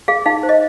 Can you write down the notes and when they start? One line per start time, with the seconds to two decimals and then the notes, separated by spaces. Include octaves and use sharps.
0.08 G#4 F5
0.26 D#4 F5
0.43 C5
0.49 D#5